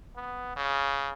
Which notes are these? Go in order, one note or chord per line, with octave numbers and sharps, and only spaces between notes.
B3
C#3